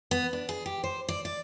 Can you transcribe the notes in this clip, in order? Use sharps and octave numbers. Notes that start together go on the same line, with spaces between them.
B3
D4
G#4
G4
C5
D5
D5